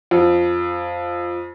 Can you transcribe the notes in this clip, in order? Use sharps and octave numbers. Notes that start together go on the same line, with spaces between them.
F2